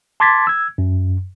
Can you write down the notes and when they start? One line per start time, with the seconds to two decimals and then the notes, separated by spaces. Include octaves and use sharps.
0.20 A5 C6 D6 G#6 A6 B6
0.47 E6 G#6
0.78 F#2